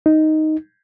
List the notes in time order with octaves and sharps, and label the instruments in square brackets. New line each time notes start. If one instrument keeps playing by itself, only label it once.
[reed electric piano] D#4